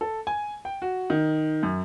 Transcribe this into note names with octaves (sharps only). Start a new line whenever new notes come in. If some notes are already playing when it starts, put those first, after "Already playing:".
A4
G#5
G5
F#4
D#3
F#2